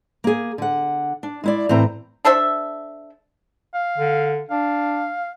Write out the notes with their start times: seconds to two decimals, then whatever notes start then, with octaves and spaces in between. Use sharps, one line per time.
0.24 A#3 G#4
0.58 D3 F#5
1.23 D4
1.44 G#3 E4 D5
1.69 A2 E3 C4 A#5
2.25 D4 A4 C5 E5
3.74 F5
3.98 D3
4.50 D4 F5